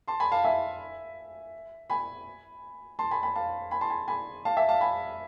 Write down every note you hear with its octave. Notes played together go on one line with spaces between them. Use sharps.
A5 C6
G#5 B5
F5 A5
E5 G#5
G#5 B5
A5 C6
G#5 B5
G#5 B5
F5 A5
G#5 B5
A5 C6
G#5 B5
G#5 B5
F5 A5
E5 G#5
F5 A5
G#5 B5